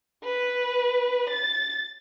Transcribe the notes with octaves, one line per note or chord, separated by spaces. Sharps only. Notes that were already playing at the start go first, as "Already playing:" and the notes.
B4
A6